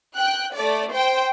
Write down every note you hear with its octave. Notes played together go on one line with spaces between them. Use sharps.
G5 F#6
A3 D5
C5 G5